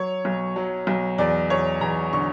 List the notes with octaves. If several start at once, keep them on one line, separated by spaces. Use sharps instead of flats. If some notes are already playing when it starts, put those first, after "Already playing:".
Already playing: F#3 C#5
B1
F#3
B1
E2 D5
E2 C#5
E2 A#5
D3 C#6